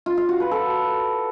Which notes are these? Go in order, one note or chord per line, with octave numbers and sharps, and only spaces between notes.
F4
F5
F#4
B4
A4